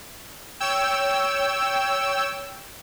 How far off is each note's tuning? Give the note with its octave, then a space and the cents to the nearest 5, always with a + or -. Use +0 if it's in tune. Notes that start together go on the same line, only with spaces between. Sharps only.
C#5 +15 G5 +0 E6 +0